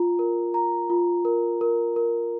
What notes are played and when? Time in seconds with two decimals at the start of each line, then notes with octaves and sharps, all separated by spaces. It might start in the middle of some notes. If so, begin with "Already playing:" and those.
Already playing: F4 A#5
0.19 A#4
0.54 A#5
0.90 F4
1.25 A#4
1.61 A#4
1.96 A#4